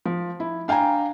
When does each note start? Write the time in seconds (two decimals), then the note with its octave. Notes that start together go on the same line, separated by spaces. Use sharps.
0.05 F3
0.40 E4
0.68 D4 F5 G5 G#5 A#5